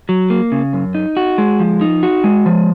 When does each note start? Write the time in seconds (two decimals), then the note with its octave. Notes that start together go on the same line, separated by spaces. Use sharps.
0.09 F#3
0.30 A#3
0.52 C#3
0.73 F#2
0.95 D#4
1.17 F#4
1.38 G#3
1.60 F3
1.81 D#4
2.03 F#4
2.24 G#3
2.46 F3